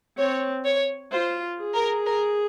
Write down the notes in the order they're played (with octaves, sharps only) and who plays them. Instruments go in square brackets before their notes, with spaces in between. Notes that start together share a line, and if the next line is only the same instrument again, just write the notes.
[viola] C4 [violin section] C#5
[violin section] C#5
[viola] F4 [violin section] C5
[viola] G#4
[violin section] A#4
A#4